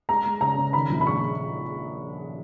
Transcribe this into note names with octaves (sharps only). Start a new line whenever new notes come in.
G#3 A#5
G#3
C#3 A#5
C#3
D#3 B5
A#1
B5
G#3 C#6
G#3